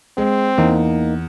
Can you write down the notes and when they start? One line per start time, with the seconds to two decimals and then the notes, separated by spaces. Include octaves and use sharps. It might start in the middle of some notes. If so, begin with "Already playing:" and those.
0.18 G#3 C4
0.58 E2 A#3 D#4